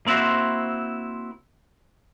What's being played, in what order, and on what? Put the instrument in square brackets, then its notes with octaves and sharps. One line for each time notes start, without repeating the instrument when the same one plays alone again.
[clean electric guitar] A#3 C4 E4 F#4 C5